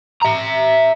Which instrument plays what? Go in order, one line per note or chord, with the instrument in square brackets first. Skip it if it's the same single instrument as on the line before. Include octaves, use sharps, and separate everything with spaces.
[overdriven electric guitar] E5 A#5